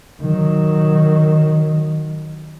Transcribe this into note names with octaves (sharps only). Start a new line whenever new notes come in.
D#3 F#3